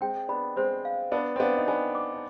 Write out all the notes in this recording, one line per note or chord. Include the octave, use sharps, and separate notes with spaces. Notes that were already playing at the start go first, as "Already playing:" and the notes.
G#3 C4 G5
B3 D4 B5
G#3 C4 C5
F5
B3 D4 B4
C4
B3 D4 F5
D#4
B3 D4 G#5
D6
D4